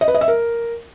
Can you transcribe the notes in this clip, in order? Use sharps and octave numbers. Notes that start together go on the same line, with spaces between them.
D#5
B4
D#5
E5
A#4